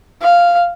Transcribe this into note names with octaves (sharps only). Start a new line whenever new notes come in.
F5